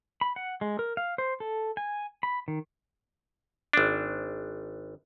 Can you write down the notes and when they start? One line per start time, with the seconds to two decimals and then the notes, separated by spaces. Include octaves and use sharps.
0.21 B5
0.36 F#5
0.61 G#3
0.79 A#4
0.97 F5
1.18 C5
1.40 A4
1.77 G#5
2.23 B5
2.48 D#3
3.73 G#1 D4